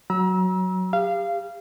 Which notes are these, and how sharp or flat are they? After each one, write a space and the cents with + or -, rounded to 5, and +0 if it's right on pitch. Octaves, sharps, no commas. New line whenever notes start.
F#3 +0 A#5 +35 E6 -20
G4 +35 F5 -20